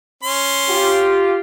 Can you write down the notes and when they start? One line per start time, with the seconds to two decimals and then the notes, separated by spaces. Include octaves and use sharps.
0.23 C#4 C6
0.69 F4 G4